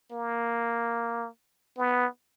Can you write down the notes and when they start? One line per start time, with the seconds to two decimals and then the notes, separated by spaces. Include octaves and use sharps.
0.12 A#3
1.78 B3